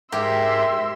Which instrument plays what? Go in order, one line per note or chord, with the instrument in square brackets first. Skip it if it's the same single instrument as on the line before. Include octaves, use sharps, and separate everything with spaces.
[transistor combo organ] G#2 A#4 [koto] G4 [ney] E5 [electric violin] C6 E6